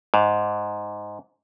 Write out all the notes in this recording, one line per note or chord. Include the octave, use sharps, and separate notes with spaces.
G#2